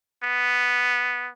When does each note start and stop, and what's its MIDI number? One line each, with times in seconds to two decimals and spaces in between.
0.23 1.29 59